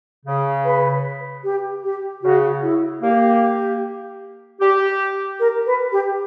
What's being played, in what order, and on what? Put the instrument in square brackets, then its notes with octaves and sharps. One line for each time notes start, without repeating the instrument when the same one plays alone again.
[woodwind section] C#3
[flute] B4
G4
G4
[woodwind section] C#3 [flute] F#4
[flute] E4
[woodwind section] A#3 [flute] G4
[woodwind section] G4
[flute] A#4
B4
G4